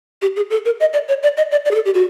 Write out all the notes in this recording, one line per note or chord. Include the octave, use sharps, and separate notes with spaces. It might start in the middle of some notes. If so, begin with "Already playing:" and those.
G4
G#4
A4
A#4
D#5
D5
C#5
D5
D#5
D5
D5
G#4
A4
G4
F#4